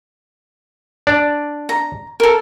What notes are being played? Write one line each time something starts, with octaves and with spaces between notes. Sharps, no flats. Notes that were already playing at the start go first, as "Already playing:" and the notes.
D4 D5
A#5
A4 A#4